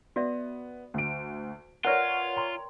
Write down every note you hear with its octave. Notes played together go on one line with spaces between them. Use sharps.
B3 F#4 D5 E5
D2 D7
F4 A#4 B4 C#5 D5 E5 F#5 F6
G5 A#5 C6